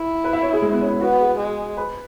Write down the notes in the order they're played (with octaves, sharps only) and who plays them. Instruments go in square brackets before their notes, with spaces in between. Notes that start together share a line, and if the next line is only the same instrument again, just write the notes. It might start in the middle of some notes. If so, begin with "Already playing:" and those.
Already playing: [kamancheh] E4
[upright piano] B4
E5
C#5
G#4
G#3
B3
C#4
E4
[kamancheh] B3 [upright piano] F#4
[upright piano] G#4
[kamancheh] G#3
[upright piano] B4